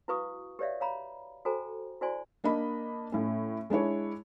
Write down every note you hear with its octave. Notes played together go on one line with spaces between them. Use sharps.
E4 F#4 B4 F5 C#6 D#6
G4 B4 C#5 D5 E5 F5
C#5 F5 A#5 B5
F#4 A4 C5 G5 G#5 A#5
E4 F#4 C5 D5 G#5 C6
A#3 D4 D#5 B5
A2 C#4
G#3 D4 E4 C#5